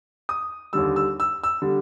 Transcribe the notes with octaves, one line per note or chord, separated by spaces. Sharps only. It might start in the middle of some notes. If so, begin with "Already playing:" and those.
D#6
D#2 D3 G3 E6
E6
E6
E6
D3 G3